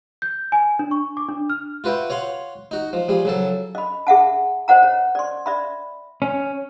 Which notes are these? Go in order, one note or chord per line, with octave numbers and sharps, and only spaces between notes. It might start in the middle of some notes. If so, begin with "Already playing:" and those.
G6
G#5
D4
C#6
D6
D4
F6
F4 F#4 B4 E5 G5
C#5 F5 F#5 C6
D#4 F#4
F3
F3 G3 G#4
C#3 F#3 A4
D#5 B5
G#4 E5 F#5 A5
C5 D#5 F#5 A#5
C#5
D5 C6
D5 E5 B5
C#4